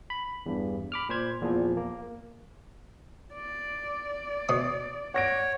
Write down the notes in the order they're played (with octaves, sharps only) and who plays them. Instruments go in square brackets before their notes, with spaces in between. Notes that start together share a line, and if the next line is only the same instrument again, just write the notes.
[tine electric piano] B5
E2 G2
B5 D6 F6
A#2 C5 G#6
E2 A#2 F3
A#3
[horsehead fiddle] D5
[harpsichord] B2 D#6
[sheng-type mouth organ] C#5 [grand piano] F#5 A#6 D7